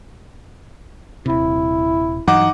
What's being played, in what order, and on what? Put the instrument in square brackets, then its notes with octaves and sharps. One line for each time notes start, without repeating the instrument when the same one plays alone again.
[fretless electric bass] D#1 C3 [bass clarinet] E4
[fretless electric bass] G2 E3 F#3 [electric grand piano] D#4 F#5 D6